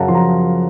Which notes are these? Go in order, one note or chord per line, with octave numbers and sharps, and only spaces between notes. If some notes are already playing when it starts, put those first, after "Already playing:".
Already playing: F#2 C#3 F5 F#5 A5 A#5
F3 C6
A#5